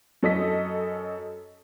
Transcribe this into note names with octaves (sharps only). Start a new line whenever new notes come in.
F#2 A4 D#5 B6